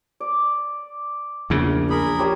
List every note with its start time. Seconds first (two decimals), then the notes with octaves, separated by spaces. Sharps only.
0.20 D5
1.50 A#1 E2 C#3
1.90 G#4 A#4 B5
2.19 G3 C#5 A#5